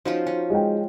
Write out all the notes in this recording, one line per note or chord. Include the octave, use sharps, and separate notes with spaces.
F3 C#4 D#4 F4 F#4 C5
C#4
G#3 G5